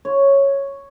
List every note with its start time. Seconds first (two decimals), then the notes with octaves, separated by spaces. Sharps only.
0.05 C#5